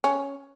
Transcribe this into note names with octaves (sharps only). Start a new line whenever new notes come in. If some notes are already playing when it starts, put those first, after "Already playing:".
C#4